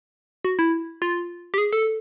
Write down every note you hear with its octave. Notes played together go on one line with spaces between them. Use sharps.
F#4
E4
F4
G4
G#4
A4